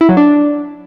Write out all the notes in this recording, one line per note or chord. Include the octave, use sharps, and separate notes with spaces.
E4
F#3
D4